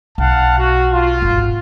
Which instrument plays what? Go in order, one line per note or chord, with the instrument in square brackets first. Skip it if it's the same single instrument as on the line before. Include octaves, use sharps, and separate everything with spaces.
[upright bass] B1 [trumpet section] F5 F#5 A5
[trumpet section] F#4
F4
[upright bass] D#1 G#1